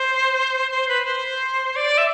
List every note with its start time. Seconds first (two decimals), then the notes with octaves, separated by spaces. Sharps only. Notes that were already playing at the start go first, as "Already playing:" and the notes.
Already playing: C5
0.71 C5
0.88 B4
1.05 C5
1.76 D5
1.98 E5